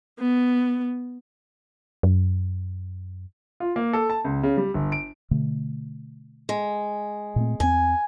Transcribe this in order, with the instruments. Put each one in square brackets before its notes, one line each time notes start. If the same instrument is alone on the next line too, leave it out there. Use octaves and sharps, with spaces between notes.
[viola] B3
[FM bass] F#2
[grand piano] F4
A#3
A4
A5
C#2
C#3
G3
G1
D7
[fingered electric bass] B2 D3 A3
[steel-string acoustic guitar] G#3
[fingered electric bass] A#2 A3 C4
[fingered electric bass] E2 C4 [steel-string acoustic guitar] G#5